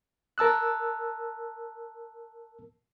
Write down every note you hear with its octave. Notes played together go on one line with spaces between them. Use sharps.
A#4 A5 E6 F#6